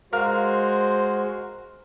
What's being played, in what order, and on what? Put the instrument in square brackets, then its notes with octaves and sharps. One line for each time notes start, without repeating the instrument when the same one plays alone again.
[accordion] G#3 F#4 [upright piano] A#4 F5 F6 [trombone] C5